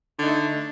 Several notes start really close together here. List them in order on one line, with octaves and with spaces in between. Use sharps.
D3 D#4 A3